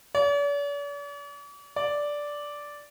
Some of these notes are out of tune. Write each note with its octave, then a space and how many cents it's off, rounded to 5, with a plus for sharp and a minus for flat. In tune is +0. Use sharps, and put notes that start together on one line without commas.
D5 -45
D5 -5